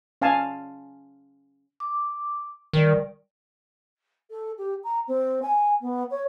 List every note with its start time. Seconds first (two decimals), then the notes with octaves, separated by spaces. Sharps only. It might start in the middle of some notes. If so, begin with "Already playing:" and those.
0.22 C#4 F5 G#5 A5
1.80 D6
2.73 D#3 G3 A#4 D5
4.30 A4
4.58 G4
4.83 A#5
5.07 C4
5.42 G#5
5.80 B3
6.10 C#5